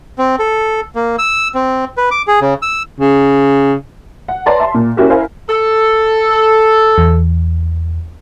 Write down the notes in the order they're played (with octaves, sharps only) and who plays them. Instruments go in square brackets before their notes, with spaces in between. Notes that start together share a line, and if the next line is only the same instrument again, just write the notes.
[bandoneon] C4
A4
A#3
E6
C4
B4
D6
G#4
C#3
E6
[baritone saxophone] C#3
[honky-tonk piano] F#5
B4 C#5 D5 A5 A#5 C6
E5 A5 C6
A#2
A#3 C#4 E4 F#4 G4 A#4
E4 A#4 C5 E5 F5 G#5
[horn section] A4
[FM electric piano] E2